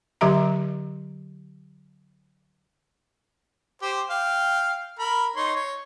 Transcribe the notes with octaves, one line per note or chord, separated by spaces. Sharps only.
D3 F#3 G4 E5 A#5
G4 C5
F5 G5
A#4 B5
D#4 C#5 C6
C#5